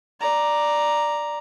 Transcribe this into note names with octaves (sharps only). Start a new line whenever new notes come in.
D5 A#5